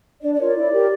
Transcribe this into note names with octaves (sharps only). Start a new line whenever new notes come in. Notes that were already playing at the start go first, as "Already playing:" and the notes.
D4 D5
D5
F4 A#4 C#5
D5
E4
G4 A#4